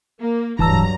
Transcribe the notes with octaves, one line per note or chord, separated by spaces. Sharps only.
A#3
D1 G2 E3 F#3 A5 A#5 E6